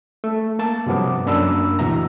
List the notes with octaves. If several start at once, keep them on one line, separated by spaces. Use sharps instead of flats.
A3
A#3 A5
G2 C3 F3 F#3 B3 D6
F#2 A#3 D4 A#5 B5 E6
D2 B2 E3 E5 A#5